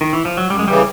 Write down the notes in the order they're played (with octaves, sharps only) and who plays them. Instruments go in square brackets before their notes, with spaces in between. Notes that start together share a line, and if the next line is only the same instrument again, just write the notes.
[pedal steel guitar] D#3
E3
F3
F#3
[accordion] F#2 [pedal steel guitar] G3
[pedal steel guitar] G#3
[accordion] C#3 E3 [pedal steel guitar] G3